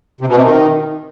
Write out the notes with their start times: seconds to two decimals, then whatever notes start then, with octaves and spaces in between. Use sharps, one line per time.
0.21 C3
0.28 B2
0.36 C3
0.44 D#3